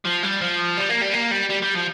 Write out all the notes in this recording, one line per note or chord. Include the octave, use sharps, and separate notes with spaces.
F3
G3
F3
G3
A#3
G3
A#3
G3
G3
G3
F3